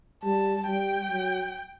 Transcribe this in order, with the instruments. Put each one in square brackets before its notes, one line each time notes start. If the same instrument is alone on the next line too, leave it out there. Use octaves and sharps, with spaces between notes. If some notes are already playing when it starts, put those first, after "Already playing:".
[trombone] G3 [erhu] A5
[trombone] G3 [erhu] G5
[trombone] F#3